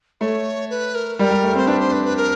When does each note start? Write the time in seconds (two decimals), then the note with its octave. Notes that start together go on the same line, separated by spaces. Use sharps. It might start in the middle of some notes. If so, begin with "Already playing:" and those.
0.21 A3 C#5
0.70 B4
0.94 A#4
1.19 G3 A#4
1.31 G3
1.43 A3
1.55 C4 C5
1.67 D4 B4
1.80 C5
1.92 B4
2.05 B4
2.17 A#4